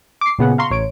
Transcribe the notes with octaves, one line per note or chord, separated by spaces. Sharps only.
D6 C7
A#2 C#3 B3 G#4 F#5
F5 A#5 C6 C#6
A1 C#5 D7